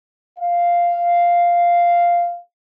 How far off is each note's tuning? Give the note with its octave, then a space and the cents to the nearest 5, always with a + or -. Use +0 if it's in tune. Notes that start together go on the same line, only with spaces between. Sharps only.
F5 -5